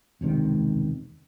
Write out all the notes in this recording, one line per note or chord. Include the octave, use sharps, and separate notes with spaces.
E1 C#2 C3 D#3